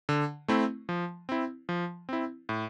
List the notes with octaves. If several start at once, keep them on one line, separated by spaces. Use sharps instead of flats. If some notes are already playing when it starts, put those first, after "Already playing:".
D3
A3 C4 E4
F3
C4 E4
F3
C4 E4
A2